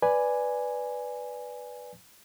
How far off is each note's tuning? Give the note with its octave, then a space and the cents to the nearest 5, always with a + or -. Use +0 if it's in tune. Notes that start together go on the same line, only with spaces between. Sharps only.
B4 +0 D5 +0 G#5 +0